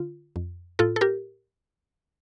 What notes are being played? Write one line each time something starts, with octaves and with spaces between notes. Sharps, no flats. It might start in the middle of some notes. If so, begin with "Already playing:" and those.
Already playing: D3 F4
F2
A2 F4 A4
A4
G4 A#4